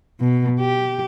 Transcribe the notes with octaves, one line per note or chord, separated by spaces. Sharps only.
B2
G4